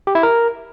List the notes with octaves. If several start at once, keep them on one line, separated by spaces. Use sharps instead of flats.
G4
E4
A#4